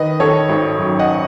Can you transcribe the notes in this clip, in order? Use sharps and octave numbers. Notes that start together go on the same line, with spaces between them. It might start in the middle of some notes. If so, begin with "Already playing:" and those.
Already playing: D#3 B4 D#5
D#3 A4 C#5
G#1
F#2
D#5 F#5